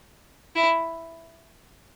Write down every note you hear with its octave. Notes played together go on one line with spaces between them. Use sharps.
E4